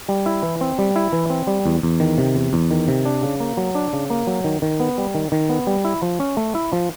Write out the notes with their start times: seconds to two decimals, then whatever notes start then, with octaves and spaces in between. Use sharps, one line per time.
0.08 G3
0.26 E4
0.42 E3
0.61 C4
0.78 G3
0.96 E4
1.13 E3
1.30 C4
1.47 G3
1.66 E2
1.83 E2
2.00 D#3
2.18 C3
2.35 E2
2.53 E2
2.71 D#3
2.88 C3
3.05 D4
3.23 C#3
3.40 A#3
3.57 F#3
3.75 D4
3.93 C#3
4.10 A#3
4.27 F#3
4.44 D#3
4.62 D#3
4.80 B3
4.98 G3
5.15 D#3
5.32 D#3
5.49 B3
5.67 G3
5.85 E4
6.02 F3
6.20 C#4
6.37 A3
6.55 E4
6.73 F3